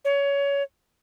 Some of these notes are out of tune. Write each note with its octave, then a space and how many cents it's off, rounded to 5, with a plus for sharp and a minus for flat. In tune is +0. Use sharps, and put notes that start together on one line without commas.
C#5 +20